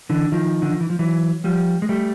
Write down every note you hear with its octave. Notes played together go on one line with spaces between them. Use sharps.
D3 E3
D#3 F3
D3
D#3
E3
F3
E3 F#3
F3 G3
G#3
G3 A3